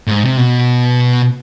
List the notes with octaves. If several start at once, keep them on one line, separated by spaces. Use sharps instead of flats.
A2
G#2
C3
B2